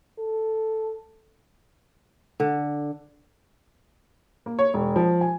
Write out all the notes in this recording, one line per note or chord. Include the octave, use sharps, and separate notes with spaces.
A4
D3
A#3
C#5
E1
F3
G#5